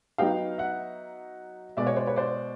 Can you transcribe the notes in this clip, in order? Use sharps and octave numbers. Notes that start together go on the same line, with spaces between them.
F#3 B3 D#4 F5 G5
E5 F#5
B2 G#3 B3 D5 E5
C#5 D#5
C5 D5
B4 C#5
C5 D5